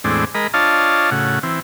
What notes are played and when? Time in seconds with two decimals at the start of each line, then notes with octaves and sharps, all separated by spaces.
0.04 E2 A2 G#3 C4 D4
0.35 G#3 A#4 D#5 B5
0.54 D4 F4 C#5 D#5 F5 A5
1.11 A2 C#3 F#4
1.43 E3 C4